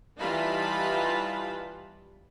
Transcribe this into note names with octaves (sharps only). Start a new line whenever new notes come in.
E3 G3 D#4 F4 A5 B5